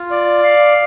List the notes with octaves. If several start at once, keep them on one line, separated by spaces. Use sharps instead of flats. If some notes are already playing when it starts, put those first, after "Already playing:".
Already playing: F4
D5
F5